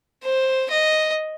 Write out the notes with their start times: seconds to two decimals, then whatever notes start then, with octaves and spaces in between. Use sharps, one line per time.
0.24 C5
0.70 D#5